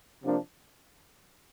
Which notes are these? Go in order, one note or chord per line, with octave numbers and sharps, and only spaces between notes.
C3 F3 A#3 D4